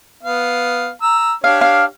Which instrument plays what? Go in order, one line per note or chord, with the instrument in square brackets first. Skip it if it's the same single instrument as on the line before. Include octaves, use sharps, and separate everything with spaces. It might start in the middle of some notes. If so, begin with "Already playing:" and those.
[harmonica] B3 F5
A#5 E6
[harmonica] D4 G4 C#5 [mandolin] F5
[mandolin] F5